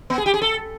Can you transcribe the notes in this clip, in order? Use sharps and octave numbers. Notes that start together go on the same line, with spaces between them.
B3
G#4
G4
G#4
A4